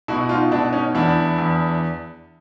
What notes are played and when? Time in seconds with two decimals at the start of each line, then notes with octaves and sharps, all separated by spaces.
0.08 B2 E4 F#4
0.29 D#4 F4
0.51 B2 D4 E4
0.73 C#4 D#4
0.95 E2 D4 E4
1.38 E2